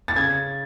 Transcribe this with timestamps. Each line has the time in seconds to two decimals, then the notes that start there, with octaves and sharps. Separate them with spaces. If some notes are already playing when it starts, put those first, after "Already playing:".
0.08 A6
0.16 C#3 G#6